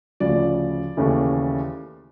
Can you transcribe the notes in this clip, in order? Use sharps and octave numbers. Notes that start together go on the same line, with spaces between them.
D2 C#3 F3 D5
D#2 C#3 E3 A3